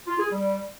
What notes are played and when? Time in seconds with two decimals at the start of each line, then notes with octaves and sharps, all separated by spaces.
0.06 F4
0.18 G#4
0.30 G3